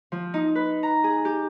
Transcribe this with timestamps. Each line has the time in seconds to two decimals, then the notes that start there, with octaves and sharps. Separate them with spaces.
0.12 F3
0.34 D#4
0.55 B4
0.83 A#5
1.04 G#4
1.25 G4